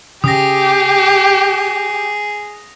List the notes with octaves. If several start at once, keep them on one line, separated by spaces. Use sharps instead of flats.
C#3 G4 G#4 D#6 A#6